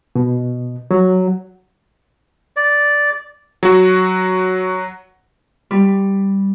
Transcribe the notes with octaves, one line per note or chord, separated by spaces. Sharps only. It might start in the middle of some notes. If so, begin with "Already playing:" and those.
B2
F#3
D5
F#3 F#4
G3